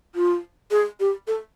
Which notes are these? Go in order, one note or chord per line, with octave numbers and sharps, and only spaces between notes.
F4
G#4
G4
A4